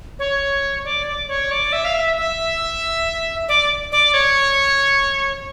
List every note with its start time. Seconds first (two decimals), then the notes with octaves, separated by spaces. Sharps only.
0.19 C#5
0.84 D5
1.06 D5
1.28 C#5
1.51 D5
1.72 E5
1.85 F5
1.94 E5
2.17 E5
3.48 D5
3.92 D5
4.14 C#5